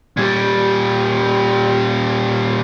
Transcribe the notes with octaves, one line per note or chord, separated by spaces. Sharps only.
A#2 G3